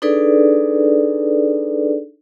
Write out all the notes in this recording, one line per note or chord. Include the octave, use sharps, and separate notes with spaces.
D4 D#4 G#4 A4 B4 D5